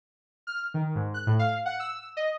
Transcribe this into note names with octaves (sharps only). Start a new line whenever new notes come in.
F6
D#3
G#2
F#6
A2
F5
F#5
E6
D#5